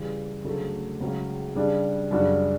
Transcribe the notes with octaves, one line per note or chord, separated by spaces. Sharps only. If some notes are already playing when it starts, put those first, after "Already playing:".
Already playing: C#3 E3 G3
D2 C#3 F#3 A3
C#2 C#3 F#3 C#4
C#3 G3 D4 G4
F#2 C#3 G3 D4 F#4